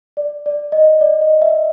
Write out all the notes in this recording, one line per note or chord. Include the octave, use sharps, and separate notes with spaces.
D5
D5
D#5
D5
D#5
E5